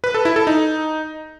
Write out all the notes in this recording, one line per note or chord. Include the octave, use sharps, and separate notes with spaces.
B4
A4
E4
A4
D#4